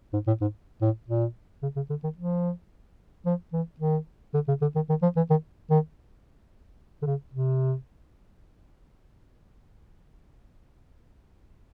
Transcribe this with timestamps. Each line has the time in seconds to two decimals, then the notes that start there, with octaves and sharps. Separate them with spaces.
0.13 G#2
0.27 A2
0.41 G#2
0.81 A2
1.08 A#2
1.63 C#3
1.76 C#3
1.90 D3
2.03 D#3
2.18 F3
3.26 F3
3.53 E3
3.80 D#3
4.34 D3
4.48 C#3
4.61 D3
4.75 D#3
4.89 D#3
5.02 F3
5.16 E3
5.30 D#3
5.70 D#3
7.02 D3
7.06 C#3
7.33 C3